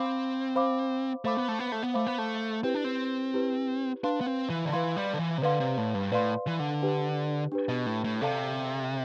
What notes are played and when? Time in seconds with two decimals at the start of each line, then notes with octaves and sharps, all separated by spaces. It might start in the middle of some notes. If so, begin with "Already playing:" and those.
Already playing: C4 C5 F5 B5 D6
0.56 C5 F5 B5 D6
1.25 A3 C5 F5 B5 D6
1.37 B3
1.48 A3
1.59 B3
1.72 A3
1.82 B3
1.94 A3 C5 F5 B5 D6
2.07 B3
2.18 A3
2.64 C4 E4 G4 B4
2.74 D4
2.84 C4
3.34 E4 G4 B4
4.04 D4 B4 F5 C6
4.21 B3
4.26 C4
4.50 E3
4.65 D3
4.72 E3 B4 F5 C6
4.97 G3
5.13 D3
5.19 E3
5.38 C3
5.43 D3 B4 D5 F5 C6
5.60 C3
5.78 A2
5.94 G2
6.12 A2 B4 D5 F5 C6
6.47 E3
6.59 D3
6.82 D4 G4 B4
7.52 D4 G4 B4
7.69 B2
7.86 A2
8.04 A2
8.21 C3 A4 D5 F5 A5